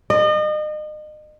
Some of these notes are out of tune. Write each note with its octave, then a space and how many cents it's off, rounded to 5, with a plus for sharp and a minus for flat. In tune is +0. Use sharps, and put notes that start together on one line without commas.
D#5 -35